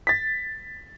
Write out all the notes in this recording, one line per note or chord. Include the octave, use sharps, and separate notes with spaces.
A6 B6